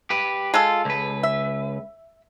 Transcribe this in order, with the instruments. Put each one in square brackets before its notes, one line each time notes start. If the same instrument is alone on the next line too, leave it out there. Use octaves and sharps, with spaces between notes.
[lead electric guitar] G4 B4
[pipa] G#3 A4 [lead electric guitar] F4
[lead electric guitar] C#2 B4
[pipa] E5